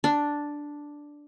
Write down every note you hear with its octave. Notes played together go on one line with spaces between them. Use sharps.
D4